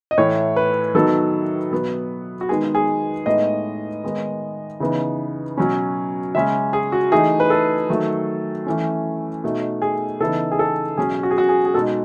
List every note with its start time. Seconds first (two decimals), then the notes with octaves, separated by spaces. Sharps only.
0.11 D#5
0.18 A2 E3 A3 C#5
0.56 B4
0.95 D#3 F#3 B3 D#4 A4
1.72 B2 F#3 B3
2.41 F#4
2.49 D#3 G#3 B3 D#4 G#4
2.75 G#4
3.26 A2 G#3 B3 D#4 D#5
4.04 D#3 G#3 B3 D#4
4.80 C#3 E3 B3 D#4
5.58 B2 F#3 C#4
6.35 C#3 G#3 C#4 E5
6.73 G#4
6.92 F#4
7.11 E3 A3 D#4 G#4
7.40 B4
7.50 A4
7.89 D#3 F#3 A3
8.67 E3 A3 C#4
9.44 B2 A3 D#4
9.82 G#4
10.20 C#3 E3 B3 D#4 A4
10.52 G#4
10.59 A4
10.97 B2 F#3 C#4 G#4
11.23 F#4
11.31 G#4
11.38 F#4
11.49 G#4
11.65 G#4
11.74 B2 G#3 D#4 A4